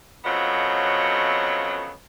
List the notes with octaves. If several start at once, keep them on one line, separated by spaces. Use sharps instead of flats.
F2 C#3 F3 F#3 B3 D#5